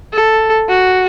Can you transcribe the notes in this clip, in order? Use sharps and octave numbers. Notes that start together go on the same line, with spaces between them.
A4
F#4